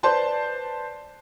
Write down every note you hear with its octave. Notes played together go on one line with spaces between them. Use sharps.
B4 C5 D5 A5 C6